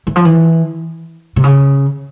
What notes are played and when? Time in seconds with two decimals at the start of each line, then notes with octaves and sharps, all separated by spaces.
0.07 E3
0.16 F3
0.25 E3
1.36 C3
1.44 C#3